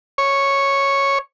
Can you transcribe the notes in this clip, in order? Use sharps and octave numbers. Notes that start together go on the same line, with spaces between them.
C#5